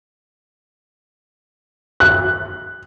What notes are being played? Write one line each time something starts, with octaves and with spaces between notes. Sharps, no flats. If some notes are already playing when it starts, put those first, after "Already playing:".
F#6